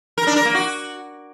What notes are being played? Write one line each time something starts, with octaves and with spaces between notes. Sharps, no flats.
A#4
D4
A#4
A#3
F#4